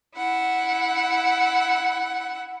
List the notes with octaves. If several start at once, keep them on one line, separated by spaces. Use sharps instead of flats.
E4 F#5